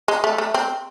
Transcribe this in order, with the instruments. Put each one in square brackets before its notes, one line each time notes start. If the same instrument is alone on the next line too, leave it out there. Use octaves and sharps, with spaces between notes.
[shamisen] G#3
A3
A3
C4